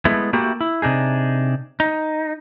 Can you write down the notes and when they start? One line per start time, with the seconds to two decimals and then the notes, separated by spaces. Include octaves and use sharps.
0.05 G#3 A3 B3 E4
0.33 A3 A#3 E4 F#4 G4
0.61 E4
0.82 C3 D4 D#4 G#4
1.80 D#4